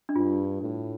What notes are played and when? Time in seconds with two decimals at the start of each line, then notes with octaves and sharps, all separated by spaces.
0.09 D4
0.15 G2 F4
0.61 A2